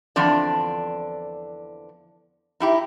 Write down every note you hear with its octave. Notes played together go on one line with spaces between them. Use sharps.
E2 D3 F3 C4 D4 D5
D#4 E4 G4